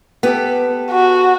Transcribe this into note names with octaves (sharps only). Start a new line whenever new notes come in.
B3 G4 A4
F#4